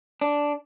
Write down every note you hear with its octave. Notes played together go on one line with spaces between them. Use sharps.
D4